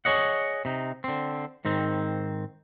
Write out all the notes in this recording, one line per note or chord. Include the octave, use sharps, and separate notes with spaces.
G#4 A4 C#5 D#5 F#5
C3 D#4
D3 C4
G#2 D#3 C4